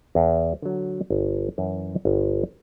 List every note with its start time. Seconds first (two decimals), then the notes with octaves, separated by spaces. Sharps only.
0.15 E2
0.62 D3 F#3
1.10 G1
1.58 F#2 E3
2.05 G1